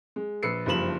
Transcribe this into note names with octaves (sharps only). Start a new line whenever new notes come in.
G#3
A#1 B4 E6 C7 C#7
F#1 G2 F3 B5 E7 F#7